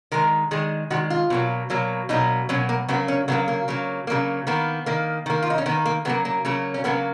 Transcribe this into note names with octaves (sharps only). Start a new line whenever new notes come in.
D#3 G#3 A#4
D#3 G#3 G#4
D#3 G#3 F#4
F4
B2 F#3 A#3
B2 F#3 A#3
B2 F#3 A#3 D#4
B2 F#3 A#3 C#4
A#3
C#3 F#3 A#3 B3
C#4
C#3 F#3 A#3 B3
A#3
C#3 F#3 A#3
C#3 F#3 A#3
D#3 A#3 B3
D#3 A#3
D#3 A#3
F4
D#4
C#4
D#3 A#3 B3
A#3
C#3 F#3 A#3 B3
A#3
C#3 F#3 A#3
C#4
C#3 F#3 A#3 B3